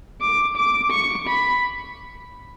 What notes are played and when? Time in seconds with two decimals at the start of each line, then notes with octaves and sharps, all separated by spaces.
0.21 D6
0.56 D6
0.91 C#6
1.27 B5